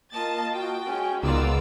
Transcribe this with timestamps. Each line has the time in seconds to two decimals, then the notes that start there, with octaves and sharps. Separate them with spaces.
0.13 A#3 F4 D#5 A5 A6
0.54 F#4 G5
0.86 G#3 C#4
1.23 C#2 B3 D#4 F4 A#4 D5 E6